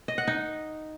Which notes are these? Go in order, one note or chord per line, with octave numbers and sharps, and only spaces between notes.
D#5
F#5
D#4